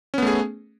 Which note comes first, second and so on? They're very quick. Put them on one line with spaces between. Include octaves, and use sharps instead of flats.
C#4 B3 A3 G#4